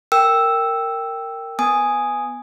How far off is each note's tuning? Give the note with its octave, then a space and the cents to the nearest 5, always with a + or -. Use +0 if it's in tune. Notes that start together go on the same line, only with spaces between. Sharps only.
A#4 -15 G5 +0 E6 +0
B3 +0 G#5 +0 D#6 +0